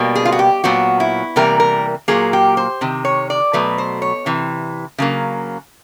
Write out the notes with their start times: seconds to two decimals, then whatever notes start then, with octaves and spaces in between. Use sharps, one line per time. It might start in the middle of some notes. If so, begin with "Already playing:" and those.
Already playing: B2 G3 A#3
0.15 G#4
0.25 F4
0.32 F#4
0.39 G4
0.64 A#2 F#3 B3 F#4
1.00 E4
1.36 C3 E3 G3 A#3 A#4
1.60 A#4
2.08 A#2 F#3 A#3 G#4
2.33 G4
2.57 C5
2.81 C3 D#3
3.05 C#5
3.30 D5
3.53 B2 F#3 A3 B4
3.78 C5
4.02 C#5
4.26 C3 E3
4.98 C#3 F#3 A#3